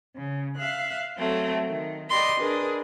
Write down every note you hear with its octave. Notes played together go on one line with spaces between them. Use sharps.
C#3
E5 F5 F#6
F#3 A3 C4
D#3
G4 D5 D#5 B5 C6
D4 G#4 A#4 B4